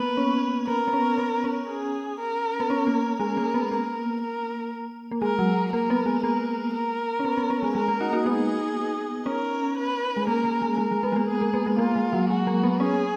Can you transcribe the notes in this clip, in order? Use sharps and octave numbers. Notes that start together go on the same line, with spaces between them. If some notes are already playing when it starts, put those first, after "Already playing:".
Already playing: A#3 B3 B4
C#4
B3 A#4
B3
C#4
B3
C#4
G#4
A#4
B3
C#4
A#3
G#3 A#4
A#3
B3
A#3 A#4
A#4
A#3
G#3 A#4
F#3
A#3 A#4
B3
G#3
A#3 A#4
A#4
C#4
B3
B3
C#4
G#3
G#3 A#4
A#3
D#4 F#4
D#4 F#4
B3 D#4 G#4
C#4 A#4
B4
G#3
A#3 A#4
A#3
G#3
G#3 A#4
G#3
B3
G#3
A#3
G#4
A#3
B3
G#3
A#3 F4
G#3
F#3
G#3 F#4
A#3
B3
C#4 G#4